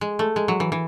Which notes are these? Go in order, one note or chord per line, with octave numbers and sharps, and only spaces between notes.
G#3
A3
G#3
F#3
E3
E3